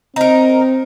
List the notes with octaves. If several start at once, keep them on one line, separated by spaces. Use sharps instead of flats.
C4 D#4 A#4